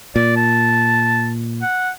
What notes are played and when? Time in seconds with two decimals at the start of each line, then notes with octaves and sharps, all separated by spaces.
0.16 A#2 D5
0.36 A5
1.62 F#5